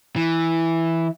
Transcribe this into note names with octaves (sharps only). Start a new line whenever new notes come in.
E3